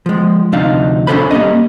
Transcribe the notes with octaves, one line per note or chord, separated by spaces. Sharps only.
F3 G#3
D2 C3 F3 D4 D#4 F5
C#4 D4 G4 A4 C5 B5
G3 A#3 C#4 D#5